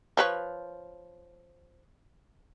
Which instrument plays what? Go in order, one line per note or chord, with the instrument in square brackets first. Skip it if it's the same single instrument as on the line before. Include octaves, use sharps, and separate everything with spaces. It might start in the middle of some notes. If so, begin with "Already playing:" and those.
[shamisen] F3 B4 C#5